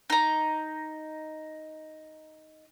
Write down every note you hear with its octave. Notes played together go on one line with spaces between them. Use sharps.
D#4 A#5